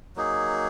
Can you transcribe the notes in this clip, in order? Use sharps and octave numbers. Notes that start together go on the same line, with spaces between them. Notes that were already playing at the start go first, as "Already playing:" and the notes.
F#3 A#3 D#4 G#4